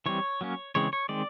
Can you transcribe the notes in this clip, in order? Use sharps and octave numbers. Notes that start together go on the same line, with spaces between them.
E3 G3 C4 C#5
F#3 A#3 C#4
C#3 E3 G#3 C4 C#5
C#5
D#3 G#3 C4 D5